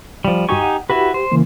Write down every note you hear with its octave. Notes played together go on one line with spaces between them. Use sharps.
F3 G3
G2 D#4 F#4 G4 G#5 C#6
F#5
E4 F#4 G4 B4
C5
C#3 E3 A#3